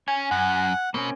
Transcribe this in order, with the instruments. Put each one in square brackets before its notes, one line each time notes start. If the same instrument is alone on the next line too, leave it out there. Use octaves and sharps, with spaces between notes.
[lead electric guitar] C#4 [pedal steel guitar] G#5
[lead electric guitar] F#2 [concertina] F#5
[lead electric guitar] B2 [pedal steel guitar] A#3 C4 C#4